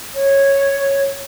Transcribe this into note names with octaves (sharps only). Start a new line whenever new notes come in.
C#5